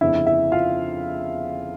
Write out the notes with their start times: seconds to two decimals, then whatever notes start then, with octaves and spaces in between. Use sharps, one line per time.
0.01 G1 F2 C#3 E4 E5
0.26 E4 E5
0.52 F4 F5